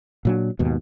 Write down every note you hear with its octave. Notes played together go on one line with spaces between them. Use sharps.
A#2 F#3 D4
D#2 G#2 B2